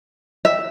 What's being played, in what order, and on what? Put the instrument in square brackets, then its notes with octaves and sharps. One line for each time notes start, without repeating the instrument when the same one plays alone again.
[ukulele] E5